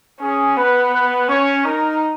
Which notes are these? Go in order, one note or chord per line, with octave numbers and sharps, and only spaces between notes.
C#4 G#4
B3 B4
B4
C#4 C#5
D#4 A#4